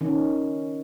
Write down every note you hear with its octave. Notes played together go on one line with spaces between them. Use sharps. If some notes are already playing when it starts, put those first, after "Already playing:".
D#3 C#4